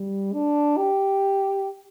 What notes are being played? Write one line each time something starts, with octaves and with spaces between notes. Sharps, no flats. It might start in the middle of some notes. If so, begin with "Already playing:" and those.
Already playing: G3
D4
G4